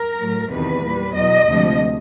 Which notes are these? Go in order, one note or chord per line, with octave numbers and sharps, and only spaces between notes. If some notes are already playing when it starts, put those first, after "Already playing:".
Already playing: A#4
A2 F#3
E2 C3 D#3 B4
A#2 G3
E2 B2 F#3 D#5
D2 C3 F3 G#3